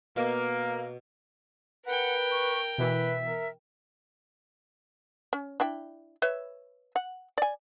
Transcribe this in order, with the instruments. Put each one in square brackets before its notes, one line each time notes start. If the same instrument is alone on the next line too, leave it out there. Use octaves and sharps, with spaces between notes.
[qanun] B2 [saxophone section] A#3
[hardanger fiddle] A#4 G5 [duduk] B4 [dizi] F#5
[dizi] C#6
[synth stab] B2 E3 [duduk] B4 [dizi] E5
[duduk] A#4
[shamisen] C#4
D4 E4 G5
B4 C#5 E5
F#5
D5 G#5